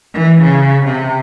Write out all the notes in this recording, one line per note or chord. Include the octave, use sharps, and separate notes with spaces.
E3
C#3
C3